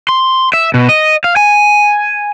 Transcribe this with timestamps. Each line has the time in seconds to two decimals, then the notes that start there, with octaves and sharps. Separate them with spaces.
0.09 C6
0.53 E5
0.74 B2
0.89 D#5
1.24 F5
1.36 G#5